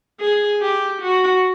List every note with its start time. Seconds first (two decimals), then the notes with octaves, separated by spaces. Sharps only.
0.20 G#4
0.61 G4
1.02 F#4